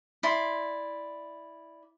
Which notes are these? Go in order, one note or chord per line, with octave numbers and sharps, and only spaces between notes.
E4 D5 C6